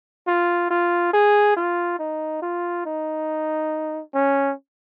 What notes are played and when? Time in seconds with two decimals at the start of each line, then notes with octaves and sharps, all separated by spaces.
0.28 F4
0.71 F4
1.13 G#4
1.57 F4
1.99 D#4
2.42 F4
2.86 D#4
4.14 C#4